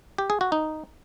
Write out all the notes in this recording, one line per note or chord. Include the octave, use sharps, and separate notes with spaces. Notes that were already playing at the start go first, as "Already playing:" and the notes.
G4
G#4
F#4
D#4